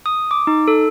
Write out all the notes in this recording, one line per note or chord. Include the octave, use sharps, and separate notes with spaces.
D#6
D6
D#4
A4